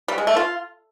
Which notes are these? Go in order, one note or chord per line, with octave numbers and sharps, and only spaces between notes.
G3
G#3
A3
F4